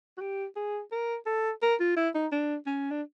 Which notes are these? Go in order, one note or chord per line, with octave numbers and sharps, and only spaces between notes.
F#4
G4
G#4
A#4
A4
A#4
F4
E4
D#4
D4
C#4
D4